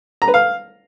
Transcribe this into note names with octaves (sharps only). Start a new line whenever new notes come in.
A#5
B4
F5